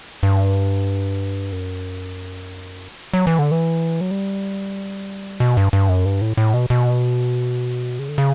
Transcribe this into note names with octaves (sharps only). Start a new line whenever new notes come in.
G2
F#2
F#3
E3
D3
E3
F#3
G3
B2
G2
G2
F#2
G2
A2
A2
B2
B2
C#3
D3
C#3